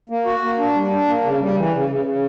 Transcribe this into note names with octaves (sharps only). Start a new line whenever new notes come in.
A#3
F#4
A#3
D4
G3
D4
A#3
C#3
G3
E3
C#3
C#3
C#3